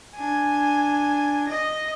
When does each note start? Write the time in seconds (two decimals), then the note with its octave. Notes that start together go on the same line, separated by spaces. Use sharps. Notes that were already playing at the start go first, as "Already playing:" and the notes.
0.16 D4 G#5
1.48 D#5 A#6